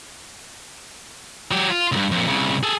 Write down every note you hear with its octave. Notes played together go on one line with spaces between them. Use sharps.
F#3 G4
F4
C#2 G2
F2 A#2
C2 C#3
G#4 A4